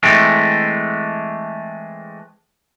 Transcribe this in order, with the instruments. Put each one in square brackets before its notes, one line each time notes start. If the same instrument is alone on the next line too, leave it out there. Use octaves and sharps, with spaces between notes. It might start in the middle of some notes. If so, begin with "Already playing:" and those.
[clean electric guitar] E3 G#3 A3 C4